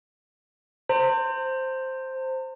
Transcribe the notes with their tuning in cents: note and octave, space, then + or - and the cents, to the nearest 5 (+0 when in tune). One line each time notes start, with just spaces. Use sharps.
C5 +0 A#5 -45